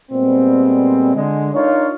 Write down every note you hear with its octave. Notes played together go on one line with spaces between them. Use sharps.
A#2 G3 G#3 B3 C4
D3 G#3
D4 D#4 F4 A#4 C#5